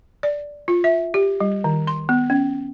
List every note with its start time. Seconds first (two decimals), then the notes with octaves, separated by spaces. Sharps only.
0.23 D5
0.68 F4
0.84 E5
1.14 G4
1.40 G3
1.64 D#3
1.87 C6
2.09 B3
2.30 C#4